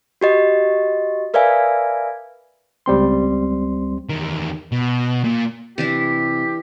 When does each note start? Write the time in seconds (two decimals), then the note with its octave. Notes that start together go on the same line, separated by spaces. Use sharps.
0.21 F#4 G4 D#5
1.34 A#4 B4 D5 E5 F5 G#5
2.86 C#2 G3 C4 C6
4.10 E2 D#3
4.72 B2
5.24 A#2
5.78 C3 E3 D4 E4 G4